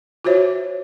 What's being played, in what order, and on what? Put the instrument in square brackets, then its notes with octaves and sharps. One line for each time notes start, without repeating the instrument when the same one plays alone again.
[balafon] F4 F#4 C5 C#5 E5